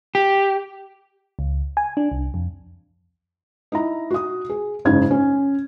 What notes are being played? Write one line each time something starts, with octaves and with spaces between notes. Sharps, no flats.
G4
C#2
G#5
D4
C2
F2
D#4 E4 A#5
F#4 D#6
G#4
F#1 G#2 C#3 G#6
C#4